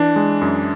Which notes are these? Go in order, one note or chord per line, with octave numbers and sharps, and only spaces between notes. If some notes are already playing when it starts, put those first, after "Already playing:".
Already playing: E3 D4
G#3
F#2